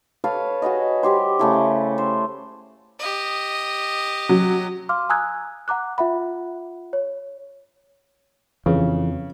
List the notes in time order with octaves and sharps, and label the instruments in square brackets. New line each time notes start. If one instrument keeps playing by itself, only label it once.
[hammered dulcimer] A4 B4 C#5 F5
F#4 G#4 B4 D#5
G3 G4 C5
C#3 A3 E4
C5
[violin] G4 D#5
[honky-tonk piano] F#3
[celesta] F5 C6 D6 F6
G#5 A#5 D#6 E6 F#6 G#6
F#5 A#5 D6 F#6
F4 E5 F#5 B5
C#5
[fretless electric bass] F2 [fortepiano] C#3 [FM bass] E3